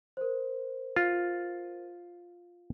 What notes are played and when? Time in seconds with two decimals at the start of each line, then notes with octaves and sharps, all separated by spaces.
0.17 A#4 C5
0.96 F4